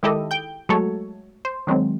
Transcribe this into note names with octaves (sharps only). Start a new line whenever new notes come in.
D#3 G#3 E4 G4 A4 D#5
G5 G6
F#3 G#3 A3 A4 C#5
C5
D#3 F#3 G#3 C4